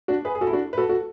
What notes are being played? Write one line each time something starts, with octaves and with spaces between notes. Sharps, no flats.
D4 F#4
G#4 B4
G#4
F#4 A4
E4
D4 F#4
B4
F#4 A4
F#4 A4